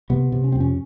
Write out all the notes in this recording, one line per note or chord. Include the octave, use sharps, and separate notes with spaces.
C3 B3
C3
C#4
C4
F2
C#4